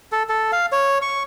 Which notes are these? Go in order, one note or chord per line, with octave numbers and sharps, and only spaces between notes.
A4
A4
F5
C#5
C#6